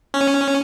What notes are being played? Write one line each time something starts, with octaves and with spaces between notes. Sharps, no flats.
C#4